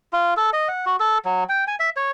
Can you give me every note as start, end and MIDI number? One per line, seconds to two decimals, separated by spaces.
0.13 0.34 65
0.37 0.50 69
0.53 0.68 75
0.68 0.85 78
0.86 0.96 66
1.00 1.18 69
1.25 1.44 54
1.49 1.64 79
1.68 1.76 80
1.80 1.90 76
1.96 2.11 73